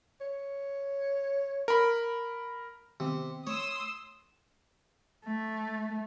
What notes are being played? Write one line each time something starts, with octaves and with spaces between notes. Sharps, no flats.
C#5
A#4 B5
C3 D#3 B3 C4
A3 C#5 C6 D#6 E6
A3